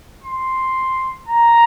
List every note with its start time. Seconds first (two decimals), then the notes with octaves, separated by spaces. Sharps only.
0.24 C6
1.28 A#5